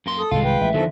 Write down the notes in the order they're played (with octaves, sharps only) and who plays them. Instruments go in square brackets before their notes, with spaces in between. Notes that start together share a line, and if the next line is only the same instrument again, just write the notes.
[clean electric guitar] F#2 A#3 C6
[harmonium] A4 [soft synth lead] D#6
[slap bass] C2 G#2 D#3 [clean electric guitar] G#3 F4 [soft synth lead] F5
[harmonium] B4 G5
[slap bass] A1 [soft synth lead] E5
[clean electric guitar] E2 D#3 F#3 [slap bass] D3 [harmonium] F3 A4